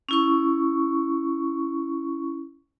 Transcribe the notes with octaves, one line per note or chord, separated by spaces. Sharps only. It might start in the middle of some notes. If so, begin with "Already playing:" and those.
C#4 E4 C#6